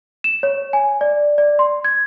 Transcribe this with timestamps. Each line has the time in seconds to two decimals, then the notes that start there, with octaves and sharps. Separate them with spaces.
0.24 E7
0.43 C#5
0.73 G#5
1.01 D5
1.38 D5
1.59 C6
1.85 G#6